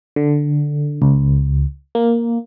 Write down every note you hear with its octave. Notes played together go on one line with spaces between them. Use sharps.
D3
C#2
A#3